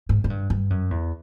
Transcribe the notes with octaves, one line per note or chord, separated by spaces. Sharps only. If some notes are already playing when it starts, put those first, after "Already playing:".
G#2
G#2
G2
G2
F#2
E2